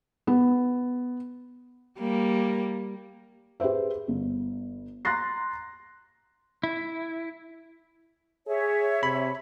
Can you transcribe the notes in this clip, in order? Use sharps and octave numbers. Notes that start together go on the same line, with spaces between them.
B3
G3 A#3
G4 G#4 B4 C5 E5
G1
A#5 C6 F#6 A6 A#6 C7
E4
G#4 C#5 E5
C3 B5